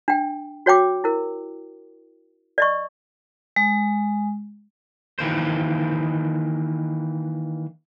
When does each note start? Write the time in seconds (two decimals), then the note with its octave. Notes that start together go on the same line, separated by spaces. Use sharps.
0.08 D4 G5
0.66 F#4 C#5 G5 D6
1.04 E4 A#4
2.58 D5 D#5 C#6
3.56 G#3
5.19 D#3 E3 A#3 C5